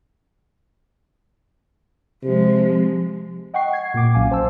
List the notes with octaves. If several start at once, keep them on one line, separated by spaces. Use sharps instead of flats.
C3 F3 G#3
D#5 F#5 G5 C#6 C7
G#6 C7
A#2 A#3 D6
B1 F#3 C#4 F5 G#5
C5 A5 E6